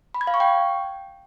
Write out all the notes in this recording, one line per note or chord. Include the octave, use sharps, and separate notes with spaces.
B5
G#6
F5
C#6
G5